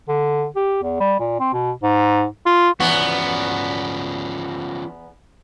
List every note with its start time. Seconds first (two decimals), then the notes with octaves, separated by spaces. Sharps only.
0.08 D3
0.56 G4
0.83 E2
1.00 G3
1.20 A#2
1.39 C4
1.53 B2
1.83 G#2
2.46 F4
2.80 E2 F3 B3 C#4 F#4